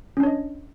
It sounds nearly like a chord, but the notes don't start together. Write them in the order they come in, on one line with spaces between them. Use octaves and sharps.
C#4 D4 C#5 D#5